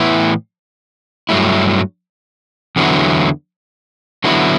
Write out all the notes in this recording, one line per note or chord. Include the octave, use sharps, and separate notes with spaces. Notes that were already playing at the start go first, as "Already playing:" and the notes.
Already playing: A2 E3 B3 E4
G2 F#3 A3 E4
E2 D3 F#3 B3 E4
D3 F#3 B3 E4